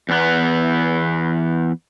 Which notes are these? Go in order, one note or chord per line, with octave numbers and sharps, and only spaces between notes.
E2 B3